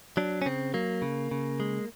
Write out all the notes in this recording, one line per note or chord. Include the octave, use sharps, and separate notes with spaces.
F#3 D4
C#4
C#3 C4
F#3 A#3
C#3
C#3
G#3